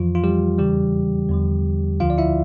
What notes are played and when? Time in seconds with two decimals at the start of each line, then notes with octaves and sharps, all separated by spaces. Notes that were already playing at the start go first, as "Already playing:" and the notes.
Already playing: F2 E3 F3 F4
0.15 F4
0.24 G3 G4
0.58 E2 C#3 E3 G3 G4
1.29 E2 D3 F3
2.00 D2 D3 F3 F4 F5
2.10 D5
2.18 E4 E5